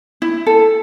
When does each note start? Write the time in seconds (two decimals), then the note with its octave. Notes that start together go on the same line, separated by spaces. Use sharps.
0.22 E4
0.46 A4